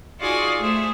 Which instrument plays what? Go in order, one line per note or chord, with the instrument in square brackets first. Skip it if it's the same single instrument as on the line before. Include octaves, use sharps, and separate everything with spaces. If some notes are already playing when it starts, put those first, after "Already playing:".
[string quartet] D#4 F4 F#4 G#4 D5 G#5
A3 G#4 C5 E5